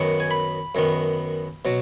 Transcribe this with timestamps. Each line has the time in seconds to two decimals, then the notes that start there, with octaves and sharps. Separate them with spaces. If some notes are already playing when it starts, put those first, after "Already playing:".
Already playing: F#2 D#3 F#3 B3 F#5
0.20 G#5
0.31 B5
0.75 F#2 D#3 B3
1.65 B2 F#3